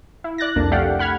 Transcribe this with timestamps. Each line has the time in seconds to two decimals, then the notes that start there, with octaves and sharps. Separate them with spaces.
0.24 E4
0.38 D5 F#6 A6 A#6
0.56 C2 F2 A#3 D4
0.72 A3 G4 D5 F5 F#5
0.99 F#5 B5 F6 G#6